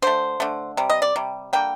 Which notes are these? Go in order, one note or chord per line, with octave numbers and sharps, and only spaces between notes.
D3 A3 C5
D3 A3
C3 G3
D#5
D5
C3 G3
D3 G3 A#3 G5